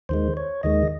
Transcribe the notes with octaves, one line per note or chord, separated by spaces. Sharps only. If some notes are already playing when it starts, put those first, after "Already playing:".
D#2 D#3 G#3 C5
C#5
D#2 D#3 G#3 D#5